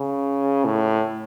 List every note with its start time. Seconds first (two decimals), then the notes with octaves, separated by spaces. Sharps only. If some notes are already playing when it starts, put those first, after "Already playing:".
Already playing: C#3
0.65 A2